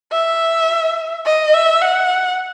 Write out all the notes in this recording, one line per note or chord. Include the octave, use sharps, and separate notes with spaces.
E5
D#5
E5
F#5